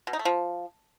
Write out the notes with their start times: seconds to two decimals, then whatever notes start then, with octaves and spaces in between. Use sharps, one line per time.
0.07 B2
0.13 D#4
0.19 A3
0.25 F3